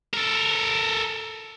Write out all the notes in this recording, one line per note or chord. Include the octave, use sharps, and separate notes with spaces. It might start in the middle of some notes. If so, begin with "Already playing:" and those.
A4 A#4